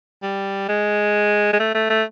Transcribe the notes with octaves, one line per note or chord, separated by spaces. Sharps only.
G3
G#3
G#3
A3
A3
A3